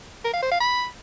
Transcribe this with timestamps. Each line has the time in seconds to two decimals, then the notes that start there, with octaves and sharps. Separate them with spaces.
0.25 A#4
0.33 F5
0.42 C5
0.51 F5
0.60 B5